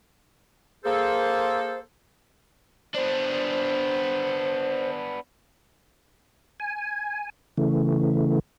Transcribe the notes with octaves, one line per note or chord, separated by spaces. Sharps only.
A#3 G#4 A4 C5
B3 D4 C5
G#5
C#3 E3 A3